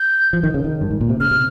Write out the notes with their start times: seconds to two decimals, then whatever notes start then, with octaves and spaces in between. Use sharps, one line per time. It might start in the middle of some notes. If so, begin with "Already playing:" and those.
Already playing: G6
0.33 F3
0.43 D#3
0.54 C#3
0.64 D#3
0.81 G2
0.91 G#2
1.01 A#2
1.10 C3
1.20 C#3 F6
1.31 C3